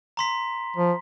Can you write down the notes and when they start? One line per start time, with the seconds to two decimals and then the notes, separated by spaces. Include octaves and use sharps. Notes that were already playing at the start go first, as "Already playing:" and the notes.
0.17 A#5 C6 B6
0.76 F3